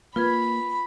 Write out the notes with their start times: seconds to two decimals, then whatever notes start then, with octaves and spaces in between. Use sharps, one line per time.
0.16 A#3 F4 B4 B5 G#6